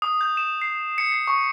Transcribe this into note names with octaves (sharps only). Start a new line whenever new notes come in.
D#6
G6
E7
C7
C#7
C7
C#6